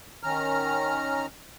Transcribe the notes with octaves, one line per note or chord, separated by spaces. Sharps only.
D#3 C#4 A#5 F6